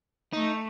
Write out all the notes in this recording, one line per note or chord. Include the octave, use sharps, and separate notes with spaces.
A3 D#4